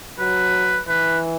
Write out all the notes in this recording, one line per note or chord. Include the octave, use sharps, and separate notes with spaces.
F#3 B4
E3 B4